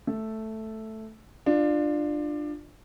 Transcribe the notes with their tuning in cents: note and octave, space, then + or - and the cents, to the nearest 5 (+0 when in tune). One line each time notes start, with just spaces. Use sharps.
A3 +0 A4 +0
D4 +20 F4 +0